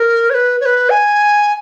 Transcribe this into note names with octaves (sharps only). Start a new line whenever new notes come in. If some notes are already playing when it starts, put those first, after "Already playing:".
Already playing: A#4
C#5
B4
C#5
B4
G#5